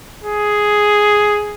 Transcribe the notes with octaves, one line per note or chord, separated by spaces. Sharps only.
G#4